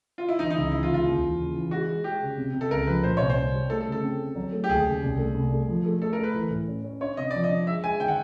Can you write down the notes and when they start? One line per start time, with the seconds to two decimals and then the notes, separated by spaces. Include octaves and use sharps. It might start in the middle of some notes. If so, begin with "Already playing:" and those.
0.18 F4
0.29 E4
0.39 E3 D#4
0.50 D#4
0.56 C#2 E4
0.72 E3 E4
0.83 F4
0.88 C#2
0.94 F4
1.06 D#2
1.21 E3
1.39 C#3
1.55 E3
1.71 G#3 F#4
1.88 G#3
2.04 G#3 G4
2.21 C#3
2.37 C3
2.54 C3
2.61 A4
2.70 C#2 A#4
2.87 F3 B4
3.04 A#2 C5
3.17 C2 C#5
3.30 C5
3.36 C2
3.53 G3
3.70 A3 A4
3.81 A4
3.87 C#3
3.92 A4
4.03 C4
4.19 C4
4.35 F#3
4.53 A3
4.64 G4
4.69 D#2 G#4
4.86 C#3
5.02 C2
5.19 A3
5.35 C2
5.52 A3
5.68 F3
5.86 A3
6.02 A3 A4
6.13 A#4
6.18 A3
6.23 B4
6.34 E3
6.51 A2
6.68 C#4
6.84 C#4
7.01 D4 C#5
7.17 C3 D#5
7.31 F3 D5
7.44 D#5
7.50 D4
7.67 G#3 E5
7.84 G#3 G#5
8.00 D#3 G5
8.08 F#5